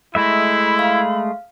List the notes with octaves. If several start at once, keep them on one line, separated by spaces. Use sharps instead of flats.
G#3 A3 E4 E5 B5
F5